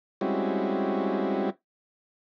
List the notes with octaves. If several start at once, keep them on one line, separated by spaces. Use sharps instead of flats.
G3 G#3 C4 C#4 E4 F#4